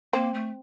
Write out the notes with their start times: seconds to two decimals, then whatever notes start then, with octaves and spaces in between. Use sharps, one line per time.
0.13 A#3 C4
0.34 A3